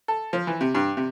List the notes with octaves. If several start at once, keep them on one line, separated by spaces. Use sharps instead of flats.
A4
F3
E3
C3
G2
C3